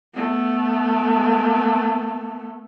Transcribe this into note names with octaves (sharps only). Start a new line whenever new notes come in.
A3 B3